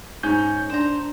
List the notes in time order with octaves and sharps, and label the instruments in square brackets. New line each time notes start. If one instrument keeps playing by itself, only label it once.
[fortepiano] G#2 [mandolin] C#4 [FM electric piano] G6
[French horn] D4 [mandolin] C5 A#5